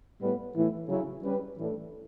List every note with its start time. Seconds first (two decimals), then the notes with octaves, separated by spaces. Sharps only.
0.20 A2 G3 B3
0.55 A2 E3 A3 E4
0.89 C#3 F#3 C#4 E4
1.23 G3 C#4 G4 B4
1.57 A2 E3 A3 D4 A4